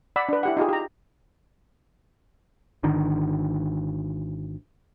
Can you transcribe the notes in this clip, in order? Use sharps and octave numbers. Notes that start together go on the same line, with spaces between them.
D5 F#5 B5 E6
D4 B4
E4 G4 F#5
D#4 F4 G4 G#4
G4 A#5
G#1 D3 D#3